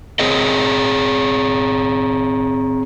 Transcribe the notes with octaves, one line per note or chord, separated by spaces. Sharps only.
C4 G#4 C#5 D#5